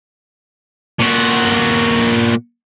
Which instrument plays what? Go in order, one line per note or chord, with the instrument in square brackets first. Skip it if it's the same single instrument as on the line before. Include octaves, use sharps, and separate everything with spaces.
[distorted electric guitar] A#2 F#4